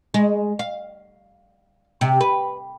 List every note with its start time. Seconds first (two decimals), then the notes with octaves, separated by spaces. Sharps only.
0.14 G#3
0.59 F5
2.01 C3
2.21 B4